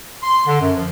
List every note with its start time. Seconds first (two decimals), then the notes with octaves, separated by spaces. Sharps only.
0.23 C6
0.46 D3
0.60 F#2
0.77 F3